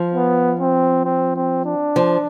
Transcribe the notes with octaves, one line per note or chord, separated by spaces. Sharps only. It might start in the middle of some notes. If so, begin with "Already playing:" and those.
Already playing: F3
B3
C4
C4
C4
D4
F3